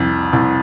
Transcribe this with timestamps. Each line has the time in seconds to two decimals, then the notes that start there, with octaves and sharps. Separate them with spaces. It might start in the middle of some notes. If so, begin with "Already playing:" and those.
Already playing: C2 F2
0.33 C2